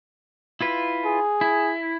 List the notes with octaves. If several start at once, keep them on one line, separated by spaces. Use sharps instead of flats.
E4 F4 B4
G#4
E4